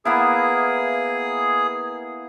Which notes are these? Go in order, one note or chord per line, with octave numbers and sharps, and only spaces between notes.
A#3 B3 E4 G#4